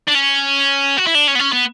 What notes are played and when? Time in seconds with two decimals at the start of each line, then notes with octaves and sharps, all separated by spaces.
0.08 D4
0.15 C#4
0.98 F#4
1.07 E4
1.15 D4
1.27 C#4
1.35 B3
1.39 C#4
1.52 B3